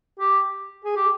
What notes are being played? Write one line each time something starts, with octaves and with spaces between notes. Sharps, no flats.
G4
G#4
G4